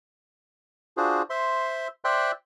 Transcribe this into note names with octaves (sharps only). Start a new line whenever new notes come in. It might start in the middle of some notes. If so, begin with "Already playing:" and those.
D4 F4 F#4 G#4 C5
C5 E5 C6
C5 D5 E5 G5 C6 F#6